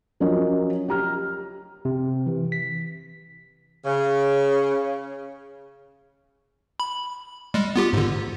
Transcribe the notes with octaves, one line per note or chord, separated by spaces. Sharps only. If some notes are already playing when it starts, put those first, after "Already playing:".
F3 F#3 C#4 A#4 C#5 D#5
G4 A#5 F6
C3
E3
B6
C#3
B5
G3 G#3
B3 F4 G4
G#2 D3